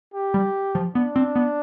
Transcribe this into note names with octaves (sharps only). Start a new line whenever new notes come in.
G4
G3
F3
B3 D4
C4
B3